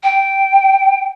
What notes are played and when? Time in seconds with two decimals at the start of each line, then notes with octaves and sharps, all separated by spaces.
0.03 G5